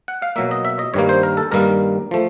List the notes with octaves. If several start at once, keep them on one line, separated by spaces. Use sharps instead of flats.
F#5
F5
B2 F#3 A#3 E5
D#5
E5
D#5
G2 D#3 G3 A#3 C#5
C5
A#4
A4
G2 D#3 G3 A#3 A#4
F3 A3